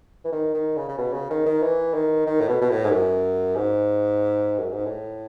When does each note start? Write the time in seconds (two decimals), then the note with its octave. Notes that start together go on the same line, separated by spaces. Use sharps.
0.24 E3
0.32 D#3
0.54 D#3
0.76 C#3
0.89 C#3
0.98 B2
1.13 C#3
1.30 D#3
1.46 D#3
1.63 E3
1.94 D#3
2.26 D#3
2.41 A2
2.48 B2
2.61 B2
2.70 A2
2.84 G#2
2.91 F#2
3.56 G#2
4.58 F#2
4.72 G#2
4.85 A2